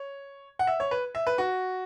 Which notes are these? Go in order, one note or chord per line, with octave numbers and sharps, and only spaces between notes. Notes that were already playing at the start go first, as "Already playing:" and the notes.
Already playing: C#5
F#5
E5
C#5
B4
E5
B4
F#4